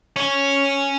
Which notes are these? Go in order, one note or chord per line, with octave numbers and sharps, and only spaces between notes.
C#4